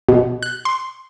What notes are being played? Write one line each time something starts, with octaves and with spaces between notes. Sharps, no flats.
B2
F#6
C6